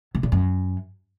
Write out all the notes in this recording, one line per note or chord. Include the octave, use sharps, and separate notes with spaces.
C3
A#2
F#2